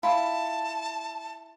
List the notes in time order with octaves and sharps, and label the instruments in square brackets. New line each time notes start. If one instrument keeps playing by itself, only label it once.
[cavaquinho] E4 F4 [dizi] A5